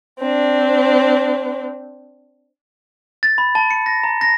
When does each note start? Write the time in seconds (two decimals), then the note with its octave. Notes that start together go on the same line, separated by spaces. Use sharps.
0.19 C4 D4
3.23 A6
3.38 B5
3.55 A5
3.71 C#7
3.86 A#6
4.04 A#5
4.21 A#6